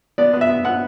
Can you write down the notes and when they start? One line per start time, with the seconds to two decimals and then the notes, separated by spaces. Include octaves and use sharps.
0.18 B3 D5
0.33 B3
0.41 E5
0.49 B3
0.65 B3 F#5